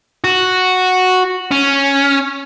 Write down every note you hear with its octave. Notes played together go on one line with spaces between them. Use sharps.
F#4
C#4